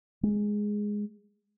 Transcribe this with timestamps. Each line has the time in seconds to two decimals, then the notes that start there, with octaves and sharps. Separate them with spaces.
0.23 G#3